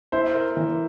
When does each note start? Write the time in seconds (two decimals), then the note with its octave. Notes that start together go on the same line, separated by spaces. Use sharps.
0.12 E4 C5
0.35 A#4
0.57 E3